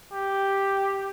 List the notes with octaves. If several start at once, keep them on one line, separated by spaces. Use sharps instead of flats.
G4